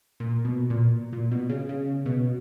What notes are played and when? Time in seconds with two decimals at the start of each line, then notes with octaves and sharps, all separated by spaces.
0.20 A#2
0.45 B2
0.70 A#2
1.13 A#2
1.31 B2
1.49 C#3
1.69 C#3
2.06 B2